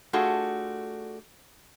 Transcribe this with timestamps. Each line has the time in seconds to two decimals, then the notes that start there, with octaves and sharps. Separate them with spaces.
0.13 A3 D4 F4 F#4 G#4 A4